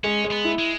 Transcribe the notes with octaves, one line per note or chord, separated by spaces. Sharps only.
G#3 C#4
G#3
B3
E4
G#3